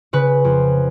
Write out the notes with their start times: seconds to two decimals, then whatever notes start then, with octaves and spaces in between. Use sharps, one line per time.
0.13 C#3 B4
0.45 F2